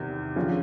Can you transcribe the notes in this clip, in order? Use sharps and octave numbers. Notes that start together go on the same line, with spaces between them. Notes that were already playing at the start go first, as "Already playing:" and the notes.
Already playing: E2 C3 D#3
D3 F3 G#3 C#4 F4